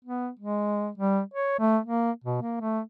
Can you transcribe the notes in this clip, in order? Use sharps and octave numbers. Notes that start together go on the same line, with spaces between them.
B3
G#3
G3
C#5
A3
A#3
B2
A#3
A3